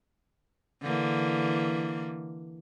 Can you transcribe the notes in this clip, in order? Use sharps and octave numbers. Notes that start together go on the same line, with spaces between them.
D3 E3 A#3